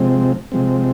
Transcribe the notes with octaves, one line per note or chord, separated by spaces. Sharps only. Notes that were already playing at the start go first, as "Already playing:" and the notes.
Already playing: C3 F3 G#3 C4
C3 F3 G#3 C4